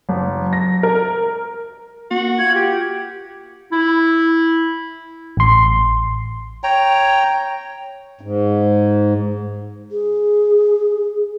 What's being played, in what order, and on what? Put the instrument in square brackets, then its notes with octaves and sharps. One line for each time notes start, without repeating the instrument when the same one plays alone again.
[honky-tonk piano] F#1
A#6
A#4
[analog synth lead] A#3 [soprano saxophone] F#4
[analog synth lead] F4 [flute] G#6
[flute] G4
[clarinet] E4
[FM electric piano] A1 C6
[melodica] C#5 G5 A#5
[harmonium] G#2
[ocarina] G#4